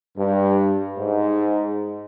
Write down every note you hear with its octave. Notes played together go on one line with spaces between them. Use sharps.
G2
G#2